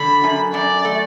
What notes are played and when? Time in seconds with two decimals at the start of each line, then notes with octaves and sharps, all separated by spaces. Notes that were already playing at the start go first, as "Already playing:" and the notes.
Already playing: D3 B5
0.24 F#2
0.54 F#2 D5
0.85 A3